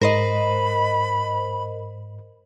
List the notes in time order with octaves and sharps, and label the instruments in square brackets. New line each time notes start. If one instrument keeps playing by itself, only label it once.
[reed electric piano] G#2 [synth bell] A#4 C5 D#5 [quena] B5